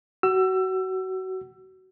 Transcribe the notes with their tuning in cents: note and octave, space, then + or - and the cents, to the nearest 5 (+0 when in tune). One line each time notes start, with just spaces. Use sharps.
F#4 +25 E6 +25